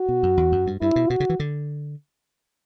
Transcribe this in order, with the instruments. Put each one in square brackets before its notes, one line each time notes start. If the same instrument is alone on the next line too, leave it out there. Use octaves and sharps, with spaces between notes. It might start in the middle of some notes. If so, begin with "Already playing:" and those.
Already playing: [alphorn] F#4
[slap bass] B2
F#2
E2
F#2
G2
[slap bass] G2 [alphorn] E4
[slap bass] B2
[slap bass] B2 [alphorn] F#4
[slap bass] C#3
E3
D3